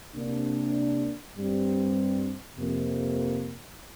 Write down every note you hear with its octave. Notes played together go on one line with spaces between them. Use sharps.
C3 A#3 D4
G2 G3 C4
F2 C3 A#3